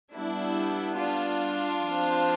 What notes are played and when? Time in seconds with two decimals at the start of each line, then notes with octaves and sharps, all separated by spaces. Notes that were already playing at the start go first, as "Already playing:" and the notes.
0.13 G3 B3 D4 E4
0.98 D4 F4
1.82 F3
1.87 C4